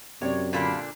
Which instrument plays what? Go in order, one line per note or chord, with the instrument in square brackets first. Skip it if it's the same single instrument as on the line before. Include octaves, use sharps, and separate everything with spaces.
[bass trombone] F#2 [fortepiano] C3 D5 [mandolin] C#5
[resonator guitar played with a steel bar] A#2 D3 D4 [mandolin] F4 A5 B5